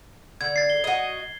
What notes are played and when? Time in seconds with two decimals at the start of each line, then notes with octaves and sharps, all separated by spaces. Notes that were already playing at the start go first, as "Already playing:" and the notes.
0.41 D3 G#6
0.56 A6 C7
0.70 G7
0.84 F#4 D#5